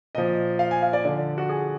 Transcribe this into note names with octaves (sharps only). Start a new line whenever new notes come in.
A#2 F3 D#5
F5
G#5
F5
D5
D3 F3 D5
F#4
G#4